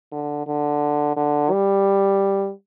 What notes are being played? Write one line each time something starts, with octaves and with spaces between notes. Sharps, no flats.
D3
D3
D3
G3